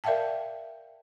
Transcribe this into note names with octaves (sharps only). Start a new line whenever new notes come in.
A#4 D5 E5 F5 G5 A5